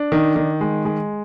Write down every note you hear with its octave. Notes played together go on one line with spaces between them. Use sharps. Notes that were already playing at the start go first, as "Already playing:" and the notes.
Already playing: D4
D#3
D#3
G#3
G#3